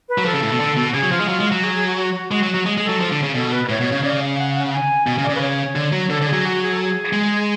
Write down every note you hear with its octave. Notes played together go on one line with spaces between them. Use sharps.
B4
F#3
F3 A4
C#3
A2
B2
D3
B2
F#4
C#3 G#4
F#3
F3 F4
G#3
F#3 F4
G#3
F#4
F#3
G#4
G#4
F#4
F#4
F#4
G#3 F#4
F#3
F#3
G#3
G#3 G#4
A4
F#3
F3
D3
C#3
B2 A4
B4
A2 C#5
B2
C#3
C#3 D5
F5
F#5
F#5
F#5
G#5
B2 G#5
C#3
D5
C#3 B4
C#5
D3
F#3
D3 A4
D3
G#4
F#3
F#4
G#4
A4
G#4
G#3